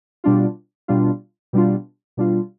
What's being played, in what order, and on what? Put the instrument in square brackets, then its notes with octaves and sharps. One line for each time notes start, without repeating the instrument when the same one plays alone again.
[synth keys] B2 G3 D4 F4
B2 G3 D4 F4
B2 G3 D4 F4
B2 G3 D4 F4